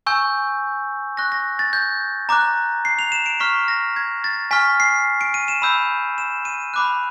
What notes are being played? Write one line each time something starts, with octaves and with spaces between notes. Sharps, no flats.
G#5 C#6 E6 G6
C#6 F#6 A#6
A#6
A6
G6
A#5 D6 F#6
C7
F7
E7
D7
C#6 F6 B6
A#6
G#6
A6
G#5 C#6 F6 B6
C7
D7
D#7
E7
B5 E6 G6
E7
D#7
B5 D6 F#6